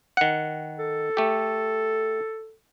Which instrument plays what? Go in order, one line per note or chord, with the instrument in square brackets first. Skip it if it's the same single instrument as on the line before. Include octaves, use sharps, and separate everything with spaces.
[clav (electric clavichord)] D#3 F#5
[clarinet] A4
[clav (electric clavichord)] A3 G4